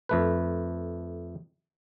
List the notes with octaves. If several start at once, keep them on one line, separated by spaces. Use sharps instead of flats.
F2 A3 B4